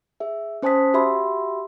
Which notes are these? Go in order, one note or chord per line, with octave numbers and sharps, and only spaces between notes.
G#4 E5
C#4 C5 G#5 A5 D#6 B6
F#4 G4 E5 B5 C6